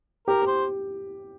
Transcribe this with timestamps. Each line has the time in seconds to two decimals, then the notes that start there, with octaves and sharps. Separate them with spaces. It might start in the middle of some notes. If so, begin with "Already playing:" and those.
0.28 G4 A#4
0.42 G4
0.47 C5